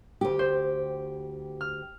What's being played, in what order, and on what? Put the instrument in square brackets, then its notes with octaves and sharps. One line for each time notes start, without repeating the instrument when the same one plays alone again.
[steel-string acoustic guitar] D2 G4
[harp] C5
F6